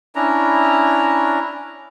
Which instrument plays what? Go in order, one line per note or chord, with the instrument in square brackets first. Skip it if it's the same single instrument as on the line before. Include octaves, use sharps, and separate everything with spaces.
[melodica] C#4 D4 E4 A#5